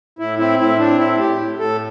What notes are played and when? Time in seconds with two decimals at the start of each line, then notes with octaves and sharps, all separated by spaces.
0.19 A2 E4
0.39 C4 E4
0.59 A2 E4
0.79 C4 D4
0.99 A2 E4
1.18 A2 G4
1.39 A2
1.59 A2 A4